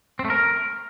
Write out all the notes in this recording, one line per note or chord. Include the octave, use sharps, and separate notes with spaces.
C4
A3
A#4